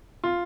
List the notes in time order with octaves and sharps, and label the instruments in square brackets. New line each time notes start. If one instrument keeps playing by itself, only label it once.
[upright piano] F4